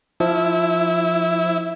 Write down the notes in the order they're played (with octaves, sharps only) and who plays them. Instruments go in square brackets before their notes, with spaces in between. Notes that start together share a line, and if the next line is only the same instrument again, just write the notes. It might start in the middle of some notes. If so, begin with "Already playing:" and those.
[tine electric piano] F3 [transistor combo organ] E4